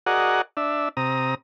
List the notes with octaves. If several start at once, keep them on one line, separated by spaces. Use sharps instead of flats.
F#4 G#4 A#4 D5 D#5 F#5
D4 E5
C3 A#5 D#6